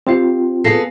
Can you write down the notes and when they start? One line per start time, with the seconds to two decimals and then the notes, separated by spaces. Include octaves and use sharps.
0.07 C4 F4 G4 C5 F5
0.64 B3 G#4 A4 F5 A#6 C7